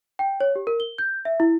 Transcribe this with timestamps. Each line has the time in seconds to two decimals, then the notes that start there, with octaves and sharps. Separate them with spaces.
0.19 G5
0.40 C#5
0.56 G4
0.67 A#4
0.80 G7
0.98 G6
1.25 E5
1.40 E4